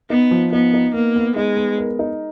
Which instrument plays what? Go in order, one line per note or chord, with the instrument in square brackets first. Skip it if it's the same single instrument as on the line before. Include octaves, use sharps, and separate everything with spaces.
[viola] B3 [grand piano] D#4
[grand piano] F3
[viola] B3 [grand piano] D#4
[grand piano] D#4
[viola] A#3 [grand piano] B3
[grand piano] B3
[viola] G#3 [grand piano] D#4
[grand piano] B3
A#4
D#4